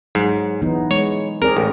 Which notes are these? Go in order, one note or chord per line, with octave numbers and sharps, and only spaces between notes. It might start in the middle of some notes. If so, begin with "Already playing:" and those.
G#2 F#3
E3 B3 D#4
G#3 C#5
C4 G#4 A#4 D5
A1